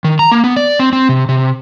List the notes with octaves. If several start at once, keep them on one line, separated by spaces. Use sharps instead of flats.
D#3
A#5
A#3
B3
D5
C4
C4
C3
C3